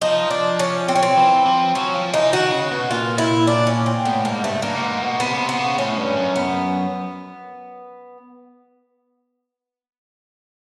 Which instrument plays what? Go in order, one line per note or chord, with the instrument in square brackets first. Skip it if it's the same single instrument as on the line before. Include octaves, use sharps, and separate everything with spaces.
[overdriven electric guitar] F3 [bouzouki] D#4
[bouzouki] D4
C#4
C4
C#4
C4
[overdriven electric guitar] E3
F3
[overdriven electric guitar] F#3 [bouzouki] C#4
[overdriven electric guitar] F3
[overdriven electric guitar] E3 [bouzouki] D#4
[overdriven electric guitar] D#3 [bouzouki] F#4
[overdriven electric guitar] C#3
B2
[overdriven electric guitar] A#2 [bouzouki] F4
[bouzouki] E4
D4
C#4
C4
[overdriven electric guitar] A2 [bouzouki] B3
[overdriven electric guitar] G#2 [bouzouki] A#3
[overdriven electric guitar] G2 [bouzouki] A3
[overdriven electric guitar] G2 [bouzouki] A#3
[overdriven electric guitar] A2
G#2
B2
[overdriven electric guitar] C3 [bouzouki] B3
[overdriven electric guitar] C#3
C3
[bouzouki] B3
[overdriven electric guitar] C#3
[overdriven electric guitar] A2 [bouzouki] C#4
[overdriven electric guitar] G2
F#2
[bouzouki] B3